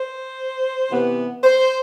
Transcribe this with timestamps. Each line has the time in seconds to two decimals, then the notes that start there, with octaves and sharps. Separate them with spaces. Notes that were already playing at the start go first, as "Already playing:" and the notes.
Already playing: C5
0.91 C3 E3 B3
1.44 C5